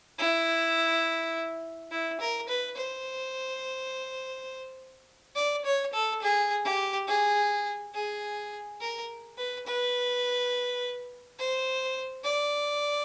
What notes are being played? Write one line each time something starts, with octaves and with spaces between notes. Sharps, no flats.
E4
E4
A#4
B4
C5
D5
C#5
A4
G#4
G4
G#4
G#4
A#4
B4
B4
C5
D5